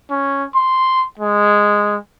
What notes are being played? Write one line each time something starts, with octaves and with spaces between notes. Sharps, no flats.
C#4
C6
G#3